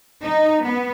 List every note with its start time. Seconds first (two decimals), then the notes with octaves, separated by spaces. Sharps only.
0.21 D#4
0.62 B3